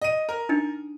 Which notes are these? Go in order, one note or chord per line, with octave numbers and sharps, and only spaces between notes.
D#5 D#7
A#4
D4 D#4 G5